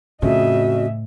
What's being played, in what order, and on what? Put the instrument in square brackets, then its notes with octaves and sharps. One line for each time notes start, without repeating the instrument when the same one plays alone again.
[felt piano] F2 C#3 [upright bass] A2 [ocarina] F#4 [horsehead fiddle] D#5 E5